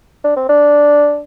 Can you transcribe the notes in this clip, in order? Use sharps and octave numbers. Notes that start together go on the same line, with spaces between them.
D4
C4
D4